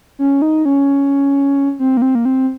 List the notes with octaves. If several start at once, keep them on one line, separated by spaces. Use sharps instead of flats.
C#4
D#4
C#4
C4
A#3
C4
A#3
C4